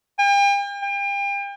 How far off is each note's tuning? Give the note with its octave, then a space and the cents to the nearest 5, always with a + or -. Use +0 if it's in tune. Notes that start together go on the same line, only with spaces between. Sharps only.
G5 +40
G5 +35